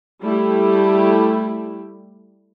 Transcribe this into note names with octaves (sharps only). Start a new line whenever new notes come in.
G3 A3 E4 G4